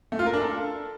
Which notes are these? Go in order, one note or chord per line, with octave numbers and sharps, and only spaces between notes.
A3
F4
A#4
D4
A4